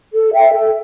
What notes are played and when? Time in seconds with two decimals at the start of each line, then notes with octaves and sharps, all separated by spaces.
0.14 A4
0.34 E5 G5
0.53 A4